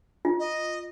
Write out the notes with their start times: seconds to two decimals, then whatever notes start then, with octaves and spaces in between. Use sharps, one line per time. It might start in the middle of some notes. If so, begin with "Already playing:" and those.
0.25 F4
0.39 D#5